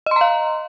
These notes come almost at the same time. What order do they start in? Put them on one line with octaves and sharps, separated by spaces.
D#5 C6 A#5 F5